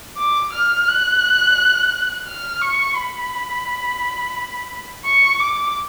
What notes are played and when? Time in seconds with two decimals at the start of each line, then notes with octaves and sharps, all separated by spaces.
0.18 D6
0.53 F6
0.88 F#6
2.27 F6
2.61 C#6
2.96 B5
5.05 C#6
5.40 D6